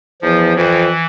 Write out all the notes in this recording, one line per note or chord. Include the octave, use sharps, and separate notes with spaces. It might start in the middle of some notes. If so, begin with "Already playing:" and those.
E2 F3
F2 E3